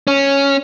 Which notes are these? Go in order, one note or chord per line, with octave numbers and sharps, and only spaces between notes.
C#4